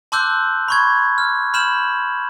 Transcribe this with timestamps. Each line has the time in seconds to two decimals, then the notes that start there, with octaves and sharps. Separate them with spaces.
0.12 A5 C6 D6 E6 F#6 G6
0.68 B5 C#6 G#6
1.18 F6
1.54 B5 F6 G6 E7 F#7